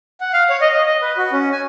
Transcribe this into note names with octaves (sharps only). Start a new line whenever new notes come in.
F#5
F5
C#5
D#5
D#5
D#5
B4
F#4
C#4
G#5